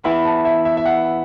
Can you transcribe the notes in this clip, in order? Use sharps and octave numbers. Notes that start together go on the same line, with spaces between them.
E3 B3 E4 B5
A5
E5
E5
E5
F#5